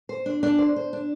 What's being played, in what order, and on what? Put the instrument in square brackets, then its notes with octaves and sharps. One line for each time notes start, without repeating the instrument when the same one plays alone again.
[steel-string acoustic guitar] C5
D4
D4
C5
C5
D4